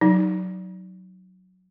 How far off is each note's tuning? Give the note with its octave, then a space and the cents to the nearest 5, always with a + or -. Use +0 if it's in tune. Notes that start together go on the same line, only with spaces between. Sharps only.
F#3 +0 D#4 +0